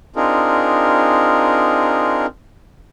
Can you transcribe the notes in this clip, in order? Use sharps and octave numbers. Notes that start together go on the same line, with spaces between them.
C4 D4 D#4 F4 G#4 A#4